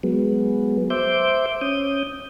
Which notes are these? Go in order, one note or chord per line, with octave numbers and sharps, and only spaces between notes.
F#3 G#3 B3
C5 E5 D6 G6
C#4 D#6 G6